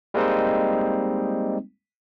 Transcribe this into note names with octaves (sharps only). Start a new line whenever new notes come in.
G3 G#3 A#3 C4 D#4